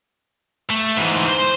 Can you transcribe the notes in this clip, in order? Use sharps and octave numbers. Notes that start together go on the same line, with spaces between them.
A3
G#2 E3
C5